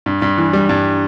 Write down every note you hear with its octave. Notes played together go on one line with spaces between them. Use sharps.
G2
G2
E3
G3
G2